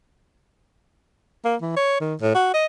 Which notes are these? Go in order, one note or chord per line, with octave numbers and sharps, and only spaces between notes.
A#3
E3
C#5
D#3
A2
F#4
D#5